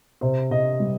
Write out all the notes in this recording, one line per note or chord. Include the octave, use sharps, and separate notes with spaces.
C3 C5
C3 D#5
G3